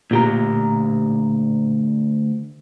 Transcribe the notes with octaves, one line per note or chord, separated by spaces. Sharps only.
D2 A#2 G4 A#5